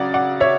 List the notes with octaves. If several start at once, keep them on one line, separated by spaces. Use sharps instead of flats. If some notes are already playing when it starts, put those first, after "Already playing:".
Already playing: C#3 F#3 D5 F#5
D5 F#5
C#5 E5